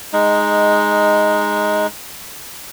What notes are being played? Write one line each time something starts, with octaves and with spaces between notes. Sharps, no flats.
G#3 D#4